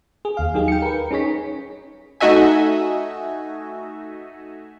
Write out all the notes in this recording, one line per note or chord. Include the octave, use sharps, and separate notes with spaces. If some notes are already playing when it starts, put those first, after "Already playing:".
G#4
D#2 F5
F#3 D#4 G4 G#4
G5 C#7
A#4 B4
C#4 D#4 G#4 C#5 B6
A3 D#4 F#4 D#5 E5 G#5